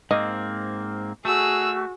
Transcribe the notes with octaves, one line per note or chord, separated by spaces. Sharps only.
G#2 A#3 C4 D#5
A3 F#4 G#4 E6